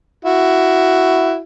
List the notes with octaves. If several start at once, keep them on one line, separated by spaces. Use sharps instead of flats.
E4 F#4